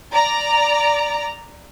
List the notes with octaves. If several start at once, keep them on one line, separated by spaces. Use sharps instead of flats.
D5 A#5